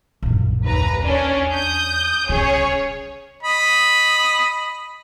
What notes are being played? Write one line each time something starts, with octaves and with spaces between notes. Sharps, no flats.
A#1 F#2
D#2 B4 A#5
E2 C#4 D4
D#6 G6
C#3 G3 C#4 G#4 C#5
D#5 B5